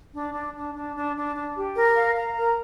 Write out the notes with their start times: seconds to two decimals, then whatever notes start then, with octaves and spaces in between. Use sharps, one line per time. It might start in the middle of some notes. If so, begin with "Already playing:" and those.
0.13 D4
0.34 D4
0.54 D4
0.74 D4
0.95 D4
1.15 D4
1.35 D4
1.55 G4
1.76 A#4
1.96 F5
2.16 A#5
2.38 A#4